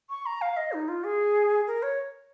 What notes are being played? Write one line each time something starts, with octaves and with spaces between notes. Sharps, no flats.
C#6
A#5
F5
D#5
D#4
F4
G#4
A#4
C#5